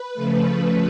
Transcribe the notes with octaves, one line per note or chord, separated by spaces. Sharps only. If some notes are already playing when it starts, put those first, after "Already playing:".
Already playing: B4
C#3 F3 A3